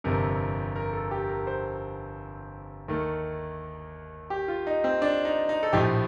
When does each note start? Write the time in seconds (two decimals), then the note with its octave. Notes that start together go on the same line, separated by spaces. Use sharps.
0.04 G1 F2 C3 A#4
0.76 A#4
0.93 A4
1.11 G4
1.29 A#4
1.47 C5
2.88 D#2 D#3 A3 A#4
4.30 G4
4.48 F4
4.67 D#4
4.84 C4
5.02 D4
5.25 D#4
5.49 D#4
5.63 A4
5.73 A#1 A2 F3 G4